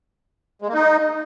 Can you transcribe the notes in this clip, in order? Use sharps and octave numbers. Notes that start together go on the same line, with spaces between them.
G#3
A#3
D#4